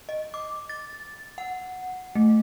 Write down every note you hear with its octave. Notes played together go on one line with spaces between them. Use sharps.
D#5
D6
A6
F#5
A3